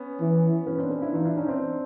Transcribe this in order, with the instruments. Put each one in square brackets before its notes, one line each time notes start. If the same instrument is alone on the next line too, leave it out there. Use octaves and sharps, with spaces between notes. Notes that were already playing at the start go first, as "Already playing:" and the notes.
Already playing: [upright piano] B3 C#4
[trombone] E3
[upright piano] B3 C#4
C4 D4
B3 C#4
D4 E4
[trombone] E3 [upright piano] D#4 F4
[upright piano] D4 E4
C#4 D#4
C4 D4